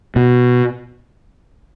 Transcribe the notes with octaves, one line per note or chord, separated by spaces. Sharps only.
B2